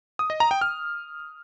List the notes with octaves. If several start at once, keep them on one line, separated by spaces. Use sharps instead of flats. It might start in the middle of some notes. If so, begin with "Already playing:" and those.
D#6
D#5
A#5
G5
F6